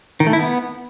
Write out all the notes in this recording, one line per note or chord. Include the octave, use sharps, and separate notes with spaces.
D#3
A3
E4
B3